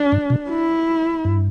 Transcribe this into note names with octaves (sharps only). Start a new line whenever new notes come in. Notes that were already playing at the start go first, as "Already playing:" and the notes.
Already playing: D4
G2
B2
E4
G2